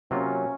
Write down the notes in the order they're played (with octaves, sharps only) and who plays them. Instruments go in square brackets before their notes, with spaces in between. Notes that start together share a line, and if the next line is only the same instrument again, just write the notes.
[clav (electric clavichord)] C3 F#3 A#3 F4 [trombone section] C#4